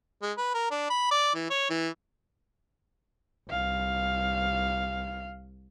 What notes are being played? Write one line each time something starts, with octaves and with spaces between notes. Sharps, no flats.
G#3
B4
A#4
D4
B5
D5
E3
C#5
E3
C2 F5